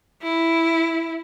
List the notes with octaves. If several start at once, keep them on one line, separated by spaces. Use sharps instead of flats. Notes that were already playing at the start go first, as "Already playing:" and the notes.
E4